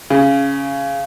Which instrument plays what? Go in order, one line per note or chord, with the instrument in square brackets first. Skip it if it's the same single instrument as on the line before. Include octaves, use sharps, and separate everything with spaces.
[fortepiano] C#3